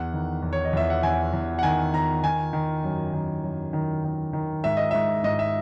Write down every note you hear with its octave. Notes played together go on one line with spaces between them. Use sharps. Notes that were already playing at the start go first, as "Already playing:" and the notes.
Already playing: E2 F#5
D#3
E2
C#5
D#5
E2 E5
F#5
E2 G#5
E2
F#5
D#3 G#5
D#3 A#5
D#3 G#5
D#3
F#2
D#3
F#2
D#3
D#3
D#3
G#2 E5
D#5
G#2 E5
G#2 D#5
E5